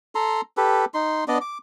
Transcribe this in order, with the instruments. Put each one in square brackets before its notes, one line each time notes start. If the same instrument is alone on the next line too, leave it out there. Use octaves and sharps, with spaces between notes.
[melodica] A4 A#5 C6
G4 A4 B4
D#4 C6
B3 D4 D5 D#5
D6